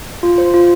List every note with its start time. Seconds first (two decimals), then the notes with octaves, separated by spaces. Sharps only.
0.23 F4
0.38 C5
0.54 F4